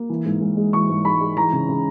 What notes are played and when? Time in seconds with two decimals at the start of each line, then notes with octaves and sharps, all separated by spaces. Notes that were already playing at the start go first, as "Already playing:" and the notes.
Already playing: A#3
0.10 E3
0.25 G#2
0.41 G#2
0.57 G#3
0.73 E3 C#6
0.89 G#2
1.05 G#2 B5
1.21 G#3
1.37 E3 A#5
1.52 C#3
1.69 C#3